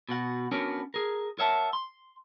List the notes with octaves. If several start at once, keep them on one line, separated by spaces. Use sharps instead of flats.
B2 F#4 F#5
B3 C#4 D4 F#4 A#4 C#5
G#4 A#4
A#4 C#5 E5 F#5 A5
C6